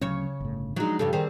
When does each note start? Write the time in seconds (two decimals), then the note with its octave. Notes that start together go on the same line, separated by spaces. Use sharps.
0.01 D2 C#3 F#3 C#4 C#5
0.40 G1 A2
0.76 F3 F#3 G#3 D4 D#4
0.99 G2 C#3 G3 A4
1.13 D#3 G3 C4 G#4